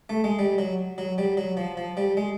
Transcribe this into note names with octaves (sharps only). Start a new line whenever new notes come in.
A3
G#3
G3
F#3
F#3
G3
F#3
F3
F3
G3
G#3